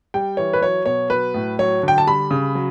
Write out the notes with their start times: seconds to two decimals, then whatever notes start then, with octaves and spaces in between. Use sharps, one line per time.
0.14 G3 G5
0.37 E3 C#5
0.53 B4
0.61 F#3 C#5
0.86 B2 C#5
1.10 F#3 B4
1.34 A2
1.59 F#3 C#5
1.83 D3
1.88 G5
1.98 A5
2.07 G3 B5
2.31 C#3
2.55 F#3